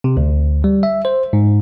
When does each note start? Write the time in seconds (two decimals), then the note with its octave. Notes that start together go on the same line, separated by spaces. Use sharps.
0.04 C3
0.17 D2
0.64 G3
0.83 E5
1.05 C5
1.33 G#2